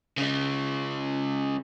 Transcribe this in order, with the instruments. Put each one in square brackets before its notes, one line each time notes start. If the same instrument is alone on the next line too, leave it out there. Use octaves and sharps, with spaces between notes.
[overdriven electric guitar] C#3 G#3